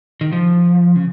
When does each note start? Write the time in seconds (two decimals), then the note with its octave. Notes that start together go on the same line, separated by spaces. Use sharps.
0.21 D#3
0.32 F3
0.96 C#3